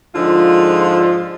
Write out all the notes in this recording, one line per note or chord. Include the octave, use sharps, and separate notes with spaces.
G#2 D3 F3 G#3 D4 F4